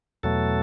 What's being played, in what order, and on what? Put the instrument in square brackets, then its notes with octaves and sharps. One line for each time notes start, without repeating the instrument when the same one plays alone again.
[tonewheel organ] E2 B2 F#3 A3 A4